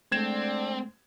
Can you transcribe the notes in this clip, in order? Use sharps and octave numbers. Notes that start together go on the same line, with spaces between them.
D3 G#3 A3 C4 D4 D5 G#6 E7